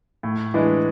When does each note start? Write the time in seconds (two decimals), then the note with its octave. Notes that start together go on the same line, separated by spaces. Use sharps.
0.23 A2
0.54 E3 G#3 D4